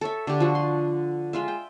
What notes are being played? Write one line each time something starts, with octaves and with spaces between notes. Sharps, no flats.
A4 C#5 E5
D3 G4
F3 F#4
C6
G#3 F4 E5
G5